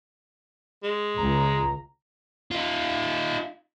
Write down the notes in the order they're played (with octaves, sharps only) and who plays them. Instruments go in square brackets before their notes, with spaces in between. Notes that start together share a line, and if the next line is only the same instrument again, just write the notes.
[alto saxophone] G#3
[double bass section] C#2 [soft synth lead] A#5
[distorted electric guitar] D#4 F4